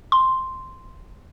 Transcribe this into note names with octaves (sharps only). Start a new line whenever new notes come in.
C6